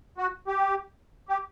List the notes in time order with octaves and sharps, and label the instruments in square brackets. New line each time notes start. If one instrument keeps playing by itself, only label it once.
[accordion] F#4
G4
G4